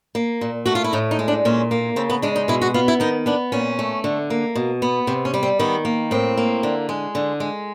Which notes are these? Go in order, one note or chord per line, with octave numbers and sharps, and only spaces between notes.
A#3
A#2
A3 F#4
F4
E4
A2 D#4
D#4
G#3
D4
A#2 C#4
A#3
C#3 C4
B3
G#3 D4
D#4
B2 E4
F#4
B3 F4
E4
D#3 D#4
B3 D4
A#2 C#4
A3
D3
A#3
B2
B3
C3 C4
C#4
G3
C4
D#3 B3
A#3
A2 C4
A#3
D3
G#3
D3
G#3